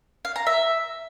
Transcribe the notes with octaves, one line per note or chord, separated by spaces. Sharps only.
F5
A#5
E5